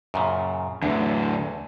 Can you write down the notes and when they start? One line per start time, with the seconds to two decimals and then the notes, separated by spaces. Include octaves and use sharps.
0.14 F#2 A#2 C#3
0.83 E2 A2 D3